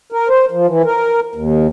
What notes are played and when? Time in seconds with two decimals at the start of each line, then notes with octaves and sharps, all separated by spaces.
0.12 A#4
0.29 C5
0.51 F3
0.67 E3
0.85 A#4
1.35 D#2